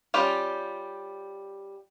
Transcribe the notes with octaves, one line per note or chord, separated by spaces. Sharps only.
G3 C#4 F4 G4 G5